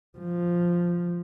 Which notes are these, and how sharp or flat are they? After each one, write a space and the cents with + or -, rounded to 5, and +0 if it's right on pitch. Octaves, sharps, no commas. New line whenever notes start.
F3 +0